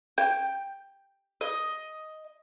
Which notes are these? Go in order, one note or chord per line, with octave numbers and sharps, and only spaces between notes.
G5
D#5